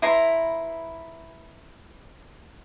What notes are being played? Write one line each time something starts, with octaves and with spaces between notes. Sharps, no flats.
E4 B4 A#5 C6